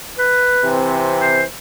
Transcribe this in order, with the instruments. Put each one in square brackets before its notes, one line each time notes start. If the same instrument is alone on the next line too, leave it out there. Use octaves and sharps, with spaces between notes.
[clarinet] B4
[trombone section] C3 E3 C4
[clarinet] C5